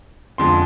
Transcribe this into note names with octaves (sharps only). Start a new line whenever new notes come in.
F2 D3 F3 G#3 C6